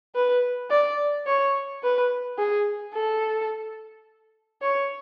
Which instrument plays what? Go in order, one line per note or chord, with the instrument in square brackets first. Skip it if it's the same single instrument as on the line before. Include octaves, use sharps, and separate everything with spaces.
[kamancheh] B4
D5
C#5
B4
G#4
A4
C#5